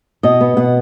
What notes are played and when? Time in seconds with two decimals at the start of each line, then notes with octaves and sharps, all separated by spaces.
0.23 B2 D#5
0.41 B3
0.57 B2 F#5